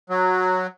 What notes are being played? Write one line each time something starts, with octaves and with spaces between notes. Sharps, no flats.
F#3